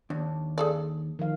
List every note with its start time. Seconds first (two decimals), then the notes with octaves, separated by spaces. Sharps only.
0.10 D#2 D4
0.58 G#4 A4 D5
1.19 D#3 F3 F5